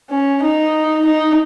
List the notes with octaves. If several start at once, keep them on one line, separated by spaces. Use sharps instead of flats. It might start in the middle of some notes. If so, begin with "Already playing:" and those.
C#4
D#4
D#4